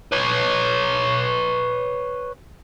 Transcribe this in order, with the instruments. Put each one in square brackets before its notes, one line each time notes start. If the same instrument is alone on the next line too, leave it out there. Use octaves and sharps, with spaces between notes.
[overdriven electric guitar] B4 C#5